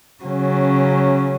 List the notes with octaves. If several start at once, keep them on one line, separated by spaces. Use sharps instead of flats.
C#3 F#3 C#4